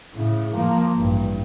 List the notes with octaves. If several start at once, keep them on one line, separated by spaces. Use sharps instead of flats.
A2 C#3
F3 A#3
A1 G2